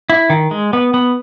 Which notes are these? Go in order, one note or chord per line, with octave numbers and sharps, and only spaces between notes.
E4
D#3
G#3
B3
B3